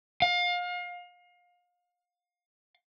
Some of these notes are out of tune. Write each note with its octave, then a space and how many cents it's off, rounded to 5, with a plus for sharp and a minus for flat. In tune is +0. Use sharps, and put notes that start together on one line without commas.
F5 +30